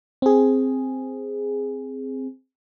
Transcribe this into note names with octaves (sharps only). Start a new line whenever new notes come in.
C4 G#4